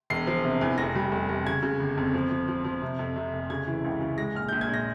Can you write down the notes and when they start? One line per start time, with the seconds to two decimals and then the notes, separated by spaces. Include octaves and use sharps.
0.10 E1 C7
0.27 F3
0.44 C3
0.61 E2
0.78 F1 A#6
0.95 G3
1.12 F1
1.29 F1
1.46 C#3 G#6
1.63 C#3
1.80 G1
1.97 F2
2.14 F3
2.31 F3
2.48 F3
2.65 F3
2.82 C3
2.99 F2
3.16 C3
3.33 F1
3.50 C#3 G#6
3.67 E3
3.84 C#2
4.01 C#3
4.17 G#3 A#6
4.35 A#1 F6
4.49 A#1 G6
4.61 G#6
4.69 A#1 A#6